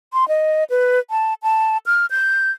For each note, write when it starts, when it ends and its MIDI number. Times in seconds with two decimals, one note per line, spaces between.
0.13 0.28 84
0.28 0.64 75
0.70 0.99 71
1.10 1.34 81
1.43 1.78 81
1.86 2.06 89
2.11 2.51 91